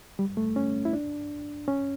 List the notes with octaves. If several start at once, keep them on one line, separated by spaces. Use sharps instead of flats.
G3
A3
C#4
E4
D4
C#4